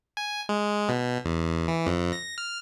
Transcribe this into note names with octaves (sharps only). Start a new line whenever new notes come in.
G#5
G#3
B2
E2
E3
F2
A#6
F6